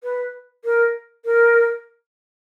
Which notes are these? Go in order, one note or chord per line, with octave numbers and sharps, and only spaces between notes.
B4
A#4
A#4